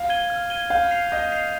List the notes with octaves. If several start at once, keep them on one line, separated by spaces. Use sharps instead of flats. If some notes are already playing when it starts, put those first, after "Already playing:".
Already playing: F5
G#6 D#7 G7
F6
G#6 D#7 G7
F5 G6
C7 F7
D#5 G6
C7 F7